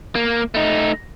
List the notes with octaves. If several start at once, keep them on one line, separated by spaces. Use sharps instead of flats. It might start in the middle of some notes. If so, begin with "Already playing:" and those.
A#3
A3 D#4